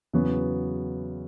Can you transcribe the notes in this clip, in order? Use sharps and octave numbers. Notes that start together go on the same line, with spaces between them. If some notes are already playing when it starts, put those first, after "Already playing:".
E2 C#3 F#3 B3 F#4